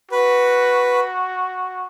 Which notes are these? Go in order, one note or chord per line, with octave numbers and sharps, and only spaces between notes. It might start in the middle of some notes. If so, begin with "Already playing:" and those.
F#4 B4